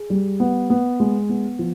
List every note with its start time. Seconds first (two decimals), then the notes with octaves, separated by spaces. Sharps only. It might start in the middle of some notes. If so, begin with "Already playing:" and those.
Already playing: G#4
0.10 G3
0.40 B3
0.70 B3
1.00 G#3
1.29 B3
1.59 F3